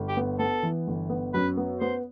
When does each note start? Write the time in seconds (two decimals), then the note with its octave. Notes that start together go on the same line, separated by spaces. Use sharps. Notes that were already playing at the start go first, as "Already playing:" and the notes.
Already playing: G1
0.09 G4
0.17 B3
0.39 B3 A4
0.63 E3
0.87 G1
1.10 B3
1.34 F#2 B4
1.57 B3
1.80 B3 C5